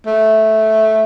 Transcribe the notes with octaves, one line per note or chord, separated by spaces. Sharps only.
A3